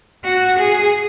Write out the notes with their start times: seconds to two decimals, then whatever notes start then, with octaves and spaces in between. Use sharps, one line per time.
0.24 F#4
0.59 G#4